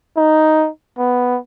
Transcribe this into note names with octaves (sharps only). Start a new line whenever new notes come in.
D#4
B3